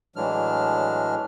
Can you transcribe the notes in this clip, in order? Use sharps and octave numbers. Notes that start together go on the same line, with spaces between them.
A2 E3 F#3 G#3 D4 F6